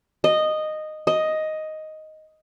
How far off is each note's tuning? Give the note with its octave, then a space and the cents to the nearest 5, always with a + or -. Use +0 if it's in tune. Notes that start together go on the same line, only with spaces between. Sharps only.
D#5 -10
D#5 +5